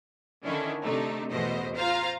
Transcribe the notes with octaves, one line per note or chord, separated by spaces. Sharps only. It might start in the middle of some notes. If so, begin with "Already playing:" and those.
D3 D#3 C#4 D4 E4
C3 A3 D4 D#4
A1 E2 B2 A3 C5 D#5
F4 C5 F5 A#5